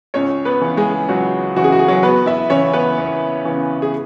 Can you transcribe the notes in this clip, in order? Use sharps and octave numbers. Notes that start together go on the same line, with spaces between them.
C#2 C#4 C#5
B3 B4
C#3 E3
G#3 G#4
C#2 F#3 F#4
C#3 E3 F#4
G#4
F#4
G#4
F#3 F#4
E2 B3 B4
E4 E5
C#3 E3 C#4 C#5
B3 B4
E2
C#3 E3
G#4